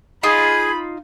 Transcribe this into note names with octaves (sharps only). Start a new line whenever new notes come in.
D#4 F4 G#4 B5